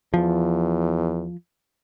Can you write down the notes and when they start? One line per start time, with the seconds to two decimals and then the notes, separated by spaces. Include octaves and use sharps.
0.14 E2 F3